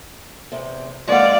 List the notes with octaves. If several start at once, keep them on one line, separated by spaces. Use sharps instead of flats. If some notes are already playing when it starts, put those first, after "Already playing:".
E2 C3
G#3 A#3 D5 F5 F#5